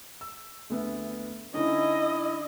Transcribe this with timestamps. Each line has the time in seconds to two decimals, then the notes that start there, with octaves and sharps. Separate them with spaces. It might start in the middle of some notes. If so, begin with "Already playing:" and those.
0.21 E6
0.70 D2 B3 E5
1.54 D3 C#4 D#4 E4 D#5